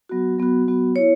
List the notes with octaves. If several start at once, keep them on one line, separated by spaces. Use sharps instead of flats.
F#3 B3 F#4
F#3 B3 F#4
F#3 B3 F#4
B3 E4 C#5